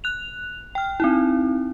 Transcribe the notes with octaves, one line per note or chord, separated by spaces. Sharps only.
F#6 F7
G5 F6
C4 D#4 E4